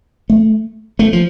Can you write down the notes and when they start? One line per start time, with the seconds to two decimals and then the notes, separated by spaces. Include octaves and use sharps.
0.30 A3
0.99 A3
1.13 F3